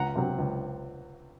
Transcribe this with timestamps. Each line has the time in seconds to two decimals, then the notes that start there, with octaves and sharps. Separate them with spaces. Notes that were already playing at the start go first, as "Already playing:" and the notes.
Already playing: C#2 F#5 A#5
0.15 C3 F#3 C4
0.38 C#2